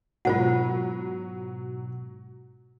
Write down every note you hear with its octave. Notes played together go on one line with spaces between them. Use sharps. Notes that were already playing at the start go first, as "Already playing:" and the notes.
G#2 B2 F#3 F4 C5 F#5